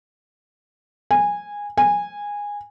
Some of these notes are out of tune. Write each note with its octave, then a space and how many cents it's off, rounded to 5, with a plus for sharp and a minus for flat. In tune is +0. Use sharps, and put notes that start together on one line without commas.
G#5 -15
G#5 -15